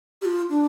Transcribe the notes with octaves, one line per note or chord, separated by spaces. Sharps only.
G4
F4
D4